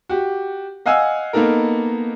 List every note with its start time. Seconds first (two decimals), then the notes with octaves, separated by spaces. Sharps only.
0.09 F#4 G4
0.86 D#5 F5 F#5 G#5 E6
1.33 A#3 B3 D#4 A4 A#4